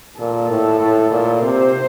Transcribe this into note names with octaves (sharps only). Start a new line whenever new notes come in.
A#2 A4
A2
A2
A#2
C3 C5